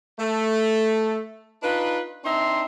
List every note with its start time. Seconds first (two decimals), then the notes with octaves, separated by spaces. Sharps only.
0.20 A3
1.63 D4 D#4 F4 B4
2.25 C4 D4 D#4 E5 A#5 C6